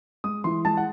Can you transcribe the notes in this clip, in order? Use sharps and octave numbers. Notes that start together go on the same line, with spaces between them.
G#3 D#6
E3 C6
G#3 A5
F#5